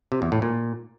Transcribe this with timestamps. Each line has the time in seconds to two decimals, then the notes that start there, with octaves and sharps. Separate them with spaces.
0.12 C3
0.22 E2
0.32 A2
0.42 A#2